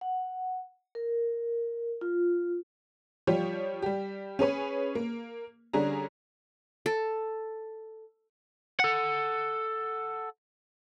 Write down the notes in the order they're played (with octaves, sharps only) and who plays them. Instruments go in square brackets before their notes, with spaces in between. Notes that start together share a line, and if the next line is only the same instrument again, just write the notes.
[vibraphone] F#5
A#4
F4
[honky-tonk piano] F3 G3 F4 G4 C#5
G3 G4
C#4 G#4 B4 C#5
A#3
D3 G3 C#4 D4 G#4 A#5
[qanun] A4
[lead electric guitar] A4 F#5